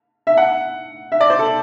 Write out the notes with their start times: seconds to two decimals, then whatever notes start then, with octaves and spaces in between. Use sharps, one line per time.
0.27 E5
0.37 F#5
1.12 E5
1.21 D5
1.30 C5
1.39 A4